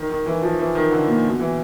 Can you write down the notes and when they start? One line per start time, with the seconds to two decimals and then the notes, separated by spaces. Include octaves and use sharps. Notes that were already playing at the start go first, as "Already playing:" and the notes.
Already playing: D#3
0.10 D#3
0.26 E3
0.42 F3
0.59 E3
0.75 D#3
0.91 D3
1.07 A#2
1.24 B2
1.40 E3